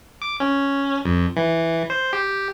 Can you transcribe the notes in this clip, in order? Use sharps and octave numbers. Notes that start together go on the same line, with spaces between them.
D6
C#4
F2
E3
C5
G4